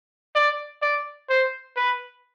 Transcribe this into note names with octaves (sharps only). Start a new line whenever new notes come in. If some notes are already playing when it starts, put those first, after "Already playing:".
D5
D5
C5
B4